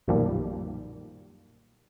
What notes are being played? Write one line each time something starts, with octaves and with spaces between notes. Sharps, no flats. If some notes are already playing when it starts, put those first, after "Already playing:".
B1 F#2 A#2 D#3 F3 G3